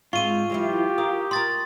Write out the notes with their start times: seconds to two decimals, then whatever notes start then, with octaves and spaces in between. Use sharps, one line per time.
0.13 G#2 G#3 C4 F4 C#6 D#7
0.50 E3 F#3 E4 G4
0.98 A#4 D#6
1.31 F4 A#4 C6 D#6 A6